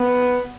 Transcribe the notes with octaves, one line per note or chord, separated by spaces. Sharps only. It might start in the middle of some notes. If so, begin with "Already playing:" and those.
Already playing: B3